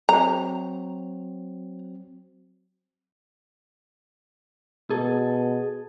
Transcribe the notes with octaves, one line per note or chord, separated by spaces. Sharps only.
F#3 C4 A#5
B2 G#4 A4